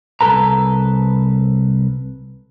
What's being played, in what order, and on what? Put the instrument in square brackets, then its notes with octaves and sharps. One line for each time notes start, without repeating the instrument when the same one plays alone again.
[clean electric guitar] C2 B2 A4 B4 A#5